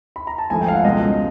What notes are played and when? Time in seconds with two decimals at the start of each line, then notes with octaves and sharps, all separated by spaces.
0.16 B5
0.27 A#5
0.38 A5
0.50 G#1 G#2 F3 A3 G#5
0.61 G5
0.68 F5
0.73 F#5
0.84 C#2 B2 G#3 C#4 D#5